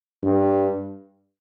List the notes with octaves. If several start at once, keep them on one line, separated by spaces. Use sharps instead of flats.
G2